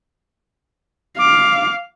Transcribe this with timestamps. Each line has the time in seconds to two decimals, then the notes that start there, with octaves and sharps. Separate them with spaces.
1.19 F5 D6